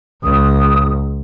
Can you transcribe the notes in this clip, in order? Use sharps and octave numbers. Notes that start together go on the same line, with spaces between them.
C#2 D#6